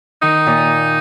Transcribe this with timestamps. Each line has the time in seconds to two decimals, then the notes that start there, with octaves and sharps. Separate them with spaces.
0.22 D#3 D#4
0.47 A#2